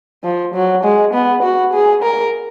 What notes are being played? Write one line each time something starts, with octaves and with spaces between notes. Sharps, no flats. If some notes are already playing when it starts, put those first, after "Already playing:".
F3
F#3
G#3
B3
F#4
G#4
A#4